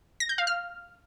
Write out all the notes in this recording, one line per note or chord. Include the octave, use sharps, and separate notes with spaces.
A#6
G6
F5
F6